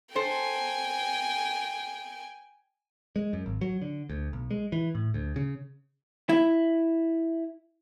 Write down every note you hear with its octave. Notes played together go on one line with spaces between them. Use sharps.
A4 C5 G5 G#5
G#3
F#2
G#1
F#3
D3
D2
B1
G#3
E3
A2
D2
C#3
E4